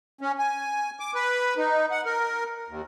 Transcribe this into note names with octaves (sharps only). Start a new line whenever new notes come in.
C#4
G#5
D6
B4
D#4
F#5
A#4
D#2